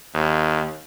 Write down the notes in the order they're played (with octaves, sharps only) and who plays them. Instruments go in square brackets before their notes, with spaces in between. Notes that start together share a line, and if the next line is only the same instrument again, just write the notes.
[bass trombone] D#2